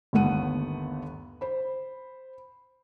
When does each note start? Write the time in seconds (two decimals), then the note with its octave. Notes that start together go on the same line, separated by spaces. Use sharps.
0.13 G1 D#2 A3 B3 F#5 D#7
1.41 C5 B5